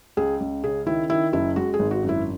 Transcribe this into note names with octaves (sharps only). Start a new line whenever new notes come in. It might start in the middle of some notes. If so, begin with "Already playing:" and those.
C#2 G#4
C#2
C#3 G#4
D#3 E4
D#3 E4
F#1 E4
G#3 F#4
G#4
G#1
F#4
F#2
E4